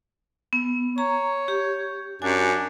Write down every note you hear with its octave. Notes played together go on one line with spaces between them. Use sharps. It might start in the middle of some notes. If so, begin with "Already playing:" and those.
B3
C#5 A#5
G4
F#2 D4 G#5